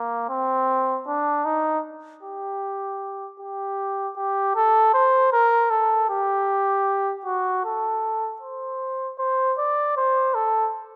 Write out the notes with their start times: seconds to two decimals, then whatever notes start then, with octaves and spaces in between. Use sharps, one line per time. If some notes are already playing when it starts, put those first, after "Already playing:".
Already playing: A#3
0.29 C4
1.07 D4
1.45 D#4
2.23 G4
3.39 G4
4.17 G4
4.56 A4
4.94 C5
5.33 A#4
5.70 A4
6.10 G4
7.25 F#4
7.65 A4
8.42 C5
9.18 C5
9.58 D5
9.97 C5
10.35 A4